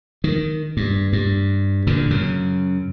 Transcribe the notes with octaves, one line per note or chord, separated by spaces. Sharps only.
D#3
G2
G2
A#2 D3
F#2 C#3